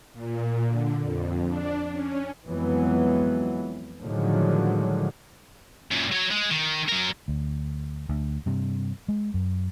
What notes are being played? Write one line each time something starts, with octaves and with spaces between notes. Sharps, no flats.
A#2
D3
F2
D4
C#4
F2 E3 F#3 G#3 B3
A2 D3 D#3 F3 F#3 G#3
F#2 A#2
F#3 C#5
G#3
D#3
F#3 A#4
D2
D2
G2 C3
G#3
F#2